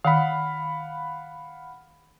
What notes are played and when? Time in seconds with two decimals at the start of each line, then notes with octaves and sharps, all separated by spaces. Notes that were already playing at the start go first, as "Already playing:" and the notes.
0.05 D#3 F5 F#5 B5